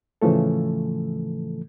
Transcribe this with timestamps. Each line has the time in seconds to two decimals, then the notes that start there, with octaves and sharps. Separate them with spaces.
0.22 A2 C#3 E3 F3 A3 A4